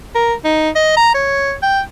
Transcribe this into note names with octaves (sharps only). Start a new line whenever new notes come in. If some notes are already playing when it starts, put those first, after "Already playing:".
A#4
D#4
D#5
A#5
C#5
G5